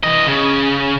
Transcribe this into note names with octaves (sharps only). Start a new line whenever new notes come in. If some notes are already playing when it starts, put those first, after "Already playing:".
E3 D#5
C#3